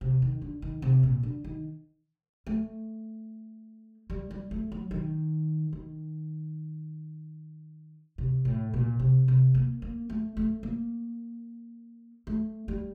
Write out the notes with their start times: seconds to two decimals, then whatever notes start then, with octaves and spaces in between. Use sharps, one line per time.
0.01 C3
0.22 D#3
0.42 D3
0.62 D#3
0.82 C3
1.03 A#2
1.23 D3
1.44 D#3
2.47 A3
4.10 G3
4.31 G3
4.51 A3
4.72 F#3
4.91 D#3
5.73 D#3
8.18 C3
8.45 A2
8.74 A#2
9.00 C3
9.28 C3
9.55 A#3
9.82 A#3
10.10 A3
10.37 A3
10.63 A#3
12.27 A3
12.68 G3